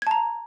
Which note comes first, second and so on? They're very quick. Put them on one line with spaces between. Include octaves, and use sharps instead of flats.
G#6 A5 A#5